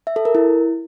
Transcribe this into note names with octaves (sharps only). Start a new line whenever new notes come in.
E5
A4
A#4
E4